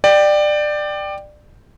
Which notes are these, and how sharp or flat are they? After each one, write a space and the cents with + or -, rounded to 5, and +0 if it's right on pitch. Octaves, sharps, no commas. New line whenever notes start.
D5 +20 G5 +0